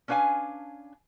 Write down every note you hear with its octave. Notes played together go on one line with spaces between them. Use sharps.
C#4 D4 B4 F5 G#5